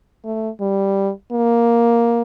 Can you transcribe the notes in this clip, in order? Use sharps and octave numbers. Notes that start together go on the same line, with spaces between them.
A3
G3
A#3